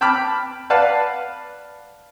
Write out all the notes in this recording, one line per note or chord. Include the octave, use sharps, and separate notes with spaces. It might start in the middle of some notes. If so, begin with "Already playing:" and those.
G5 A5 B5 D6 F6
B4 D5 F5 F#5 A5